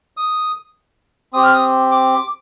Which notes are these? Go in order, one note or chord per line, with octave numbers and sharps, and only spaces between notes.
D#6
C4 G4 D#6
F6
D#6
D6